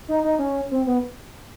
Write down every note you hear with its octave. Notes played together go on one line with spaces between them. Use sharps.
D#4
D#4
C#4
C4
B3